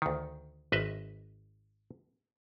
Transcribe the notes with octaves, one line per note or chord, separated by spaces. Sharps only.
D2 D#3
G#1 B4 D#5 E5